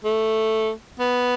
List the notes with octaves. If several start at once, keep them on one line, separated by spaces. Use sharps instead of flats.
A3
B3